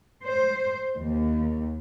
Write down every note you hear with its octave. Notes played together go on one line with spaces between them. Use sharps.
C5
D#2